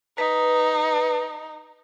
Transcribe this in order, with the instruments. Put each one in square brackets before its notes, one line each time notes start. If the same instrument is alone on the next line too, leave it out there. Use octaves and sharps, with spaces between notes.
[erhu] D#4 [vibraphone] B4